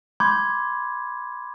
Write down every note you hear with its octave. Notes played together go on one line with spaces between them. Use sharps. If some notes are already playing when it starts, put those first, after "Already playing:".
B5 C6 D6 G6 G#6